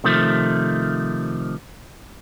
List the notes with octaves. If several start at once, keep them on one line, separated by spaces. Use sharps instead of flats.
C3 D#3 F3 A3